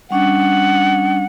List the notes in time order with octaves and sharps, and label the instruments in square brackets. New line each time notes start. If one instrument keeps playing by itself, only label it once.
[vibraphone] G3 C#4 D4 [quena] F#5